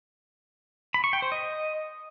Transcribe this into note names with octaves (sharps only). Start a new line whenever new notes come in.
B5
C#6
G5
C5
D#5